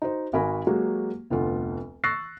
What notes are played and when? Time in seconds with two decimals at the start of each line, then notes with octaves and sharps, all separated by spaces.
0.02 D#4 F#4 C5
0.33 G#1 F#4 A#4 G#5 B5
0.67 F#3 G#3 A#3 F#4 G4
1.30 F1 D2 B3 F4
2.04 C#6 E6 F#6 A6 A#6 C7